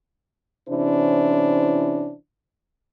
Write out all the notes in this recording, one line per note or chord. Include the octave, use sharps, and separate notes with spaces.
C3 E3 C#4 D4 E4 C5